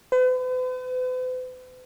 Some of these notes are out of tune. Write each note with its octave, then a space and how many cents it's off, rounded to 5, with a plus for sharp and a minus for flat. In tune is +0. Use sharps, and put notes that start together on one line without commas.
B4 +45